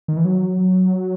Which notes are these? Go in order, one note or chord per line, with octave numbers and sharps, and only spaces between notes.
D#3
E3
F#3